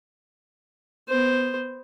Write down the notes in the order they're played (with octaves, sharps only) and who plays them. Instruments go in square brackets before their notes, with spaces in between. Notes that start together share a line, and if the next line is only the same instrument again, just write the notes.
[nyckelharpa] B3 C5